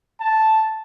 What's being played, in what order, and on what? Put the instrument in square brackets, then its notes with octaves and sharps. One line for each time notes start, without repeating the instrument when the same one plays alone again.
[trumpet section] A5